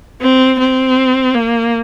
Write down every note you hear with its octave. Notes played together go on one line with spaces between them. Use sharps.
C4
C4
A#3